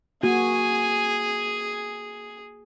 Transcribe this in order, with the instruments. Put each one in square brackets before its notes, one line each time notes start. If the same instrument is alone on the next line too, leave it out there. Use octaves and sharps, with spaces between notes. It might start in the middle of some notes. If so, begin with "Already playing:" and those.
[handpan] A#3 F#4 [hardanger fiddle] G#4 [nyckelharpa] G#5